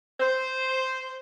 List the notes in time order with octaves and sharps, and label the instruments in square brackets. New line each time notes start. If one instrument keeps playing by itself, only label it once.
[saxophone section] C5